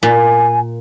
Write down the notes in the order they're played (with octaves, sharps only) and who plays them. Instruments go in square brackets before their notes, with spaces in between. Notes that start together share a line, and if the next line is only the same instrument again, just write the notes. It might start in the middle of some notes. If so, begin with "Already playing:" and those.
[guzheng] A#2 [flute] G#5